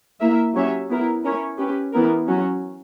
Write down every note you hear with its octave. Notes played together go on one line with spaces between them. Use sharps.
A#3 E4 A#4 E5
F#3 C#4 G4 C#5 E5
B3 E4 A#4
C#4 E4 A#4 C#5
C#4 G4 B4
E3 B3 E4 A#4
F#3 C#4 F#4